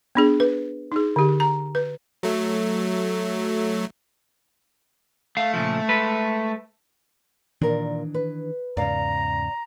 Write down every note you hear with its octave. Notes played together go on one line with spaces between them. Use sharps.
B3 D4 G#4
B4
D#4 G#4
D3 G4
A#5
B4
F#3 A3
A3 F5
A#2 C#3 F3
G#3 A4 B4
A#2 D#3 E3 D4 A#4 D5
B4
E2 G#2 C#3 D5 F5 A#5